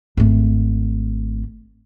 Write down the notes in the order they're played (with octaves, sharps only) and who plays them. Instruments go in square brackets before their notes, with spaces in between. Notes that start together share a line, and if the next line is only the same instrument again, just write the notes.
[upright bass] G#1 A3